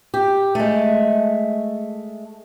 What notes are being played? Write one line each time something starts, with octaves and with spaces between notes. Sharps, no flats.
G4
G#3 A3